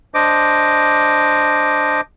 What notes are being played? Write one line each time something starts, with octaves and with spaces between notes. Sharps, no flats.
D4 C5 D#5 D6